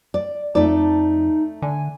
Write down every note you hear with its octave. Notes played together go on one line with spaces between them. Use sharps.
D5
F2 A3 D#4 A4 D5
D3 G#5